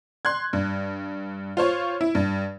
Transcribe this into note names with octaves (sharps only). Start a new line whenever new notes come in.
C6 F#6 G#6
G2
F4 C5 C#5
E4
G2